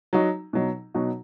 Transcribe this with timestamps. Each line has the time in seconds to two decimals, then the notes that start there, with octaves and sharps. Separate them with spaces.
0.13 F#3 D#4 F#4
0.53 B2 F#3 D#4
0.94 B2 F#3 D#4 F#4